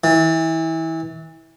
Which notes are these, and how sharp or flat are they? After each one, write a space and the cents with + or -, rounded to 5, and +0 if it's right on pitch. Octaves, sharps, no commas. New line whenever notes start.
E3 -25